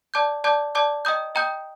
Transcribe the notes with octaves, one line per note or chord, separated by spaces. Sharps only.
D5 A5 D6 G6
D5 A5 D6 G6
D5 A5 D6 G6
D#5 G5 A#5 D#6 G6
D#5 G5 A#5 D#6 G6